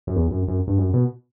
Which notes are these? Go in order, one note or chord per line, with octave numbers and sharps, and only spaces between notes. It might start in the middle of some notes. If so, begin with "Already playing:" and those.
F#2
E2
F#2
F#2
G2
F#2
B2